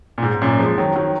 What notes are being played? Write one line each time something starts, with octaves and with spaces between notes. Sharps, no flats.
A#2
G#2
G#2
F#2 A#2
F3 G#3
D#3 F#3
D#3 F#3